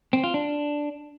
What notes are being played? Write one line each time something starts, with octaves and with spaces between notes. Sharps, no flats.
C4
F4
D4